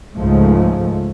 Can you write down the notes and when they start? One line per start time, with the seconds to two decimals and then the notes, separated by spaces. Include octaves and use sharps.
0.14 C#2 G#2 F3 G#3 A3